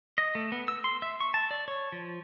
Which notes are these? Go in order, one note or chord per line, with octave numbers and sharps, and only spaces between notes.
D#5
A3
B3
E6
C6
E5
C#6
A5
D5
C#5
F3